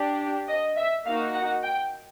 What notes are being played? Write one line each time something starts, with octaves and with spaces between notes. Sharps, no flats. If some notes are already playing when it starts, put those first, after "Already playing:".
Already playing: D4 G4
D#5
E5
A#3 D#4 F#4 F5
F#5
G5